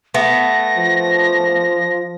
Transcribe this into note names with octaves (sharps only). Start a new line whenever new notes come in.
A3 B3 A#6
F3